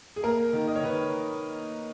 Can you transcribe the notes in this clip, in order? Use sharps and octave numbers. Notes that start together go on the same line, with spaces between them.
G#4
A#3 A#4
D#3
D#5
C#5
D#3 B4